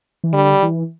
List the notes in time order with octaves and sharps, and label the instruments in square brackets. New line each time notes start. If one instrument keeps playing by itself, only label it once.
[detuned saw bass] E3
[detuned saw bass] D3 [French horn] G3
[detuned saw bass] E3